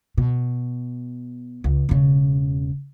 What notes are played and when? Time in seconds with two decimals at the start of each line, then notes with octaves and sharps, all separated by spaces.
0.18 B2
1.64 C#2
1.89 E1 C#3